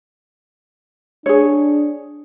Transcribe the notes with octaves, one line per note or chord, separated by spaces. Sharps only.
D4 G#4 C#5